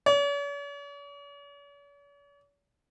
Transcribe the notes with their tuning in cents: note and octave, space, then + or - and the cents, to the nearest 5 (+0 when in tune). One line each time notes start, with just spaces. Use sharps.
C#5 +45